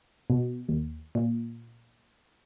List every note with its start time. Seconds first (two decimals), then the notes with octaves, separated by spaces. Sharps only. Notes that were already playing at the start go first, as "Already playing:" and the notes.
0.30 B2
0.69 D#2
1.15 A#2